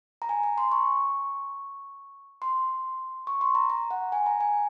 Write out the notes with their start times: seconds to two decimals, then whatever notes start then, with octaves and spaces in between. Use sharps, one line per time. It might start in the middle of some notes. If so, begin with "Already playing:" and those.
0.22 A#5
0.29 G#5
0.43 A#5
0.58 C6
0.72 C#6
2.42 C6
3.27 C#6
3.41 C6
3.55 A#5
3.70 A#5
3.91 F#5
4.12 G#5
4.26 A#5
4.40 G#5